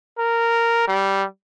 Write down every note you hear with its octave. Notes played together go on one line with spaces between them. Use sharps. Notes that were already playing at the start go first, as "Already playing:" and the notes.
A#4
G3